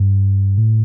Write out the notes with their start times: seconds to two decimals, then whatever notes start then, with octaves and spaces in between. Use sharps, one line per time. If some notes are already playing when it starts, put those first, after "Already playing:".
Already playing: G2
0.58 A2